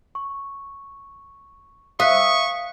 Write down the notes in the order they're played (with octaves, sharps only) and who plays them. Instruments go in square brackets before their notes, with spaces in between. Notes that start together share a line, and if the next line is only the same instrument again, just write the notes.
[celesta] C#6
[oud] E5 [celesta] F5 F#6 B6 [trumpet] C#6 [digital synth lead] D#6